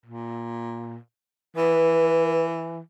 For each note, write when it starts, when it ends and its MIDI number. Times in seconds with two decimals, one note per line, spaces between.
0.06 0.97 46
1.56 2.79 52
1.56 2.41 71